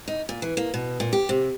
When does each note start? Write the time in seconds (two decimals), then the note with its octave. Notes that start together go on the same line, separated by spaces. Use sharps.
0.08 D#4
0.29 A#2
0.42 E3
0.57 A#3
0.74 B2
1.00 A#2
1.13 G4
1.29 C3